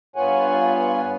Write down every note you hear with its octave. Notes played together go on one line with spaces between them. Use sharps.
G2 B3 F4 C#5 F#5 G#5